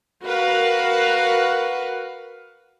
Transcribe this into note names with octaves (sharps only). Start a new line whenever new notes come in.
F#4 A#4 B4 F5 F#5